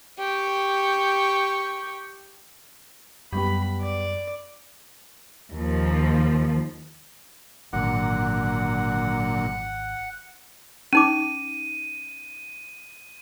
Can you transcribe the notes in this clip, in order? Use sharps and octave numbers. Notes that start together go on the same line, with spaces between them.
G4 C#6
F#2 G3 B3 G4 B5
D5
D#2 F3
G#1 A#2 D3 F#3 F#5
C#4 D#4 D6 D#7